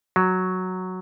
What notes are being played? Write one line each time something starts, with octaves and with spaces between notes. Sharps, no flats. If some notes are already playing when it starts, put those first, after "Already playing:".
F#3